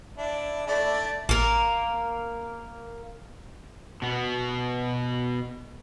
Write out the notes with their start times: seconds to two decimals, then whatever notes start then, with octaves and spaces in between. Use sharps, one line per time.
0.18 D4 E4
0.67 A3 D4 E4 D5
1.29 A1 A#3 A#4
4.02 B2 B3